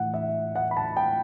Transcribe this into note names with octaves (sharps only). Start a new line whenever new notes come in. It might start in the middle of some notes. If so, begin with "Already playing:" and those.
Already playing: A2 E3 F#5
E5
F#5
B5
A5
G5